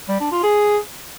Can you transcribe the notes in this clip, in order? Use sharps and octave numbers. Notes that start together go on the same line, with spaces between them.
G3
D4
F4
G#4